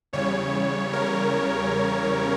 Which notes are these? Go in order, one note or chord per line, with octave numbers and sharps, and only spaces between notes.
E2 C#3 G3 C#5
A#4